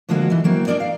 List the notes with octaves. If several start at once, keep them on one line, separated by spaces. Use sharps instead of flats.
D2 D3 F3 G#3 A#3 F#4
E3 D#4
F#3 A#3 C4
D4 D#4 A#4 D5 D#5
F5